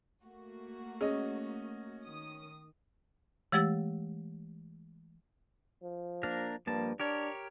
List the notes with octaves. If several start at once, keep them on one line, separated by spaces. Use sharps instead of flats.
A3 A#3 F#4
C#4 G#4 D#5
D#3 D#6
E3 G#3 A3 G4 E6 A6
F3
A#3 D4 A#4
G2 F3 A#3 A5
D4 G4 A#4 C#5